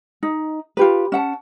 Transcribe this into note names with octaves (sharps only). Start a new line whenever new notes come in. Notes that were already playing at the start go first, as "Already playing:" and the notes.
D#4
F4 G4 B4
C#4 F#5 A5